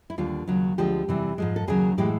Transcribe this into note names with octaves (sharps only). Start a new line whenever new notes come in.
E4
D#2 D3 G3 F4
D#2 C#3 F#3
D2 D3 F3 G#3 G4
E2 C3 E3 G3
G#2 F3 G#3
A4
D#2 C#3 F#3 G#4
A2 E3 G#3 G4